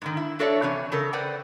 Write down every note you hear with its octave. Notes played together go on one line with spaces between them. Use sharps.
G#2 D3 D#3
E4
D4 F#4 A4 C#5 D5 E5
C3 E3 C#4
C#3 A4 A#4
B4 C5 D5 F#5 G5